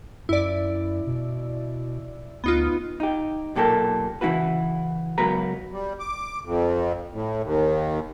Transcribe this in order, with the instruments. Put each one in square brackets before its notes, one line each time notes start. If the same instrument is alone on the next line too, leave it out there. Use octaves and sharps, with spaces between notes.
[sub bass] F#2 [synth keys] E4 D5
[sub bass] B2
[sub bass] D2 [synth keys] B3 D#4 F4
[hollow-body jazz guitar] D#4 G4
B1 A#2 G4 A4 A#4
C#3 E3 B3 E4 F#4 B4
C#2 F#3 B3 A#4 B4 A#5
[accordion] G3
D6
F2
A2
D#2